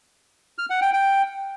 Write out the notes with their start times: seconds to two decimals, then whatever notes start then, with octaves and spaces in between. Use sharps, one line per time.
0.58 F6
0.70 F#5
0.82 G5
0.93 G5